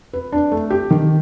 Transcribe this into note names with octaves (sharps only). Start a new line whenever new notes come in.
B4
D4
A3
G4
D#3